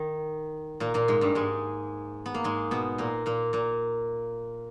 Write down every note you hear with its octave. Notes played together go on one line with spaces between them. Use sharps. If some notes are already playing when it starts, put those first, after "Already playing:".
Already playing: D#3
A#2 A#3
A#2 A#3
G#2 G#3
G2 G3
G#2 G#3
B3
A#3
G#2 G#3
B2 B3
A#2 A#3
A#2 A#3
A#2 A#3